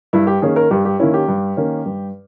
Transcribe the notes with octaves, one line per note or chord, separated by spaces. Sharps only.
G2 E4
G4
D#3 A#3 C#4 G#4
A#4
G2 G4
G4
D#3 A#3 C#4 E4
G4
G2
D#3 A#3 C#4
G2